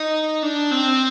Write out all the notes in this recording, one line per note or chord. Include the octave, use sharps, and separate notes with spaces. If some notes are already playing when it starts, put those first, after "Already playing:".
Already playing: D#4
D4
C4